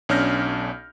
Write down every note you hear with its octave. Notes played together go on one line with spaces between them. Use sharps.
B1 C#4 D4 F6 G6 A#6